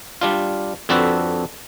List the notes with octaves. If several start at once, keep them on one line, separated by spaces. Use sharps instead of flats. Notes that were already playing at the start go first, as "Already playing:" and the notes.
G3 D4 F4
F2 C4 D4 F#4 A4 B4